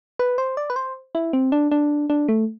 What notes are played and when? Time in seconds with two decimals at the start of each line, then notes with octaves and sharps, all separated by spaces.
0.19 B4
0.38 C5
0.57 D5
0.70 B4
0.76 C5
1.15 E4
1.33 C4
1.52 D4
1.71 D4
2.10 D4
2.29 A3